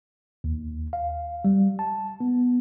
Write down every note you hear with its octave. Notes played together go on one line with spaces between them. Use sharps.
D#2
F5
G3
A5
B3